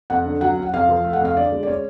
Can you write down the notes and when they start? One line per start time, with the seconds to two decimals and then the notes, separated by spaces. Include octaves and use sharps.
0.10 F2 F#5
0.26 D3
0.41 F#3 F#5
0.57 C#4
0.63 F#5
0.73 F2 F5
0.89 F3
1.04 A3
1.13 F#5
1.21 F2 F5
1.36 D3 D5
1.52 G#3
1.63 D5
1.68 C#4 C#5